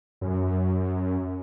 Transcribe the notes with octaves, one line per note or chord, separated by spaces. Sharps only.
F#2